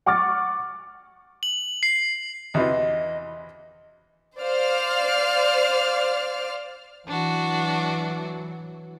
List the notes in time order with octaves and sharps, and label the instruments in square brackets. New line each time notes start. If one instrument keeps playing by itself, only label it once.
[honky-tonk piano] F#5 C#6 D6 F6 A6
[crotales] F#7
C7
[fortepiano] E2 C3 E3 [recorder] D#5
[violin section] C5 D5 F5 F6
[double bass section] E3 F#3 [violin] D4 F#4